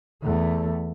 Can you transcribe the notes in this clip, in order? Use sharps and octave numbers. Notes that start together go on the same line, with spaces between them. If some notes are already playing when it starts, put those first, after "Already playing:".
E2 A3